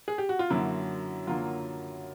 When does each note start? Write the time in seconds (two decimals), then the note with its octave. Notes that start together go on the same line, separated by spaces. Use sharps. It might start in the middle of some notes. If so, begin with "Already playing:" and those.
0.08 G#4
0.18 G4
0.29 F#4
0.39 F4
0.50 F#2 D3 F#3 A#3 E4
1.27 F#2 D3 F#3 A#3 F4